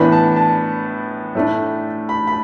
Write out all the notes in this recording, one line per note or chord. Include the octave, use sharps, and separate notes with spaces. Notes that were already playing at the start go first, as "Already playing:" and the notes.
Already playing: A2 E3 B3 D4 B5
A5
A5
A2 A3 D4
B5
B5